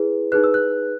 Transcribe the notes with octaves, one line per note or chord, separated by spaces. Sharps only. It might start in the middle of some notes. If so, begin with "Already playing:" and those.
Already playing: E4 G#4 B4
D#4 G#4 B4 F#6
E6
F#6